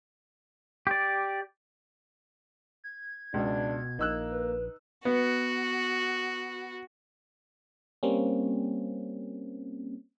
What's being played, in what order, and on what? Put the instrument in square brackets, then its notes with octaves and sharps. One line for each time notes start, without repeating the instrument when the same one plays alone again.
[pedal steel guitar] G4 D5
[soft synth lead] G#6
[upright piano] C#2 [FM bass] B2 [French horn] D4
[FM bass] A#1 [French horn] A#3 [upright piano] D#4 E6 F#6
[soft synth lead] B4
[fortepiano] B3 [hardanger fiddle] F#4
[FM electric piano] G3 A#3 C4 C#4